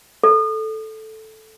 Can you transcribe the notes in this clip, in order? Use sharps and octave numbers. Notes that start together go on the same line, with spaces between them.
A4